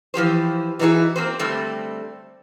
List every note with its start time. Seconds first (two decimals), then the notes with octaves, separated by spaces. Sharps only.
0.14 E3 F3 G4 C5
0.79 E3 G3 D#4 E4 F#4 G#4
1.16 A#3 C4 C5
1.39 D3 G3 A3 C4